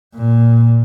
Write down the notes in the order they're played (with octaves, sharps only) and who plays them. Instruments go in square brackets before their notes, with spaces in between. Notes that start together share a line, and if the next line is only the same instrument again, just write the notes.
[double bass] A#2